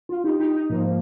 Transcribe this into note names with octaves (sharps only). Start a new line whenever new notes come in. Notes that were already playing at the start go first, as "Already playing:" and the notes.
F4
D#4 G4
D#4 G4
D#4
G#2 F3 A#3 D#4